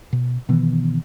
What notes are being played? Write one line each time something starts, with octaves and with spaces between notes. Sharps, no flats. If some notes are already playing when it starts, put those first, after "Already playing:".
B2
B2 D#3 E3 B3